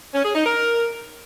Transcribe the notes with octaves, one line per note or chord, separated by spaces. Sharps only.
C#4
G#4
D#4
A#4